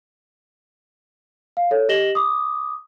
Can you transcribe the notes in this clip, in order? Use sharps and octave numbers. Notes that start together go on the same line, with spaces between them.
F5
A4 C#5
G4 D#5 A#6 E7 F#7 G7
D6 D#6